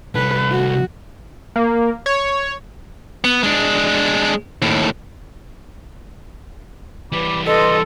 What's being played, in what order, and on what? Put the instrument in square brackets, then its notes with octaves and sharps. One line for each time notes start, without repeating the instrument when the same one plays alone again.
[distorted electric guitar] C2 A4 [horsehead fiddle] B4
[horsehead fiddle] F#4
[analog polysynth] A#3
C#5
[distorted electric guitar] B3
G#3 D4
D#2 A2
[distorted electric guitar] E3 G3 [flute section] B4 B5 D6
[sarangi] A4 [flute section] B4 C6 [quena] D#5